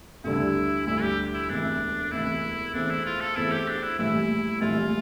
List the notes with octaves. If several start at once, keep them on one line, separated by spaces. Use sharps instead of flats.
D2 D3 G3 E4
D2 D3 G3 E4
G4
E4
E1 D2 C3 E3 D4
E1 D2 C3 E3 E4
E2 E3 A3 C4 D4
E4
F4
A4
E2 E3 A3 C4 E4
G4
D4
E4
A#1 A2 E3 G3 E4
A#1 A2 E3 G3 F4